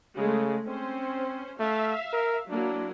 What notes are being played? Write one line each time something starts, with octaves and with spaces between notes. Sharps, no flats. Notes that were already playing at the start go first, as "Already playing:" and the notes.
C#3 G#3 A3
C4 C#4 C5
A3 E5 F5
A#4
F#3 A#3 D4 E4